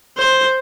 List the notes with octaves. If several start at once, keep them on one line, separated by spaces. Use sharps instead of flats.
C5